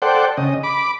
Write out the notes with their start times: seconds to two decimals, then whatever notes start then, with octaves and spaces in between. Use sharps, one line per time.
0.02 A4 C5 D5 F#5 G5
0.37 C#3 D#5
0.63 B5 D6